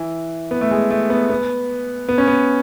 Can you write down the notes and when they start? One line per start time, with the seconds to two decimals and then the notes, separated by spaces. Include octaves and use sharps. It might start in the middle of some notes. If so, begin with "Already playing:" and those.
Already playing: E3
0.51 B3
0.61 A3
0.71 G#3
0.91 A3
1.10 B3
1.30 B3
2.09 B3
2.18 C#4
2.27 B3